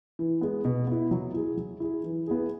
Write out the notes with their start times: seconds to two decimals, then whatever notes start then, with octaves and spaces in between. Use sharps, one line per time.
0.19 E3
0.41 G#3 B3
0.65 B2
0.87 B3 E4
1.11 F#3
1.34 E4 G#4
1.57 F#3
1.80 E4 G#4
2.04 E3
2.27 B3 E4 G#4